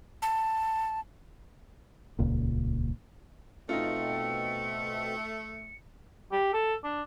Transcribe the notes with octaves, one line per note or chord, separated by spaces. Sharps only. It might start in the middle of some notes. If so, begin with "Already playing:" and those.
A5
D#1 C#2 A#2
B2 A3 C4 D#4 F4 C#7
G4
A4
D4